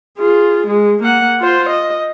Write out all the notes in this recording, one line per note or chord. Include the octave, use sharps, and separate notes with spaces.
F4 G#4
G#3
A#3 F#5
F4 C5
D#5